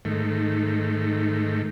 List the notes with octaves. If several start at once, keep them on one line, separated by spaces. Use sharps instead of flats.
G#2 D#3 A3